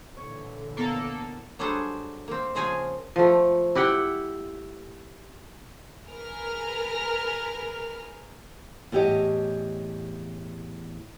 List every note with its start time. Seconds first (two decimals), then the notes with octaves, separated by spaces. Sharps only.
0.17 A#2 D3 E3 C#5
0.77 A#3 B3 A4
1.59 F#3 G3 D4 G#4 A4 C5
2.28 A#3 C4
2.55 C#3 F3 C4 G#4 F5 G#5
3.16 F3 A3
3.75 E4 G4 F#5 G5
6.09 G#4 A#4 B4 F6
8.92 E2 A2 G4 C#5 D#5